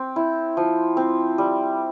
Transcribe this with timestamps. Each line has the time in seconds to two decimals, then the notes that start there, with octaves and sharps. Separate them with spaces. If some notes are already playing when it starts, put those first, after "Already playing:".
Already playing: C4
0.16 E4
0.57 F3
0.97 C4
1.38 G3